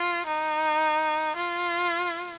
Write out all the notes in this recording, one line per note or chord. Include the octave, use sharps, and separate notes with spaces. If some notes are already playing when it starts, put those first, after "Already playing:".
Already playing: F4
D#4
F4